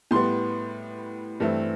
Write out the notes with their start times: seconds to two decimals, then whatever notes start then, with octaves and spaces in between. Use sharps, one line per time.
0.11 A2 G3 B3 C6
1.40 G2 E3 A3 C4